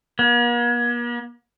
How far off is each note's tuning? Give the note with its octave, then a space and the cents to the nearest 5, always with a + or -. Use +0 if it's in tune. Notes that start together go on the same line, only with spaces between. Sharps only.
A#3 +45